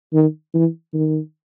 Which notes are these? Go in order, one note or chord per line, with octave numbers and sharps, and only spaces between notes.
D#3
E3
D#3